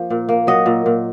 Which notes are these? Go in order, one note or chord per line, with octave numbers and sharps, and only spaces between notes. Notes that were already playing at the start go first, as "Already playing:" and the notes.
Already playing: F3 A#3
A#2
A#3
F#3 D#5
A#2
A#2